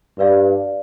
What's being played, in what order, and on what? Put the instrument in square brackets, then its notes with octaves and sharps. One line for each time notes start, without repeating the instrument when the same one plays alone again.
[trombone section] G2 [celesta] B4 D5 F5